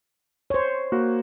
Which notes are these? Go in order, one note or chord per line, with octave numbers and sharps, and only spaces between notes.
C5 C#5
A#3 F#4